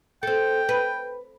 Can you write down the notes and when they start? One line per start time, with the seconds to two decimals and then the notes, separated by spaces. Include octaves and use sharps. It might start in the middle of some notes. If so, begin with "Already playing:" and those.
0.23 C4 A4 G5
0.69 B4